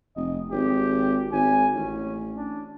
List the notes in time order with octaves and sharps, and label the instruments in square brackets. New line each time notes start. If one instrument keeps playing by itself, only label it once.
[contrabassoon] F1 [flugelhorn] D#5
[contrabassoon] G#1 [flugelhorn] G4
[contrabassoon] G#1 [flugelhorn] G#5
[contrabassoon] A1 [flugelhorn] C#4
[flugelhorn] D4